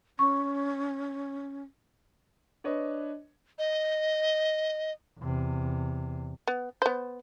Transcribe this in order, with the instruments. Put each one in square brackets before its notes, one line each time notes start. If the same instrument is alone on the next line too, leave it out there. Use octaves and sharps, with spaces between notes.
[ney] C#4 [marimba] C#6
[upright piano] D4 B4 C#5 D#5
[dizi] D#5
[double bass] E2 C3
[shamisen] B3
B3 C5